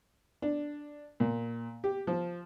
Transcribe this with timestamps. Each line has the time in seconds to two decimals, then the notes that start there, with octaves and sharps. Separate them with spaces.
0.42 D4
1.20 A#2
1.84 G4
2.07 F3